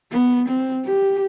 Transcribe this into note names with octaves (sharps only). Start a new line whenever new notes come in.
B3
C4
G4